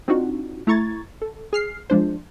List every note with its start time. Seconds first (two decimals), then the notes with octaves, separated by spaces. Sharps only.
0.08 C4 D4 D#4 F4 F#4
0.67 A3 E4 A#5 C#6 G#6 A6
1.22 A4
1.53 G#4 F6 C7
1.90 F3 G#3 D4 C5